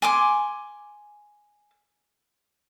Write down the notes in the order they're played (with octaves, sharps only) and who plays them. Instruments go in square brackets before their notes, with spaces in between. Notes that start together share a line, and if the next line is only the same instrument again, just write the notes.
[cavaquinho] G#5 C6 D6